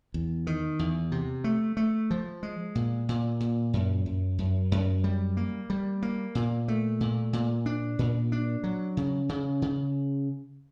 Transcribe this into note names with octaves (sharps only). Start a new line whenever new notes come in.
E2
D#3
E2
C3
A3
A3
F3
G#3
A#2
A#2
A#2
F#2
F#2
F#2
F#2
G3
A#3
G3
A#3
A#2
A3
A#2
A#2
D4
A#2
D4
F#3
C#3
C#3
C#3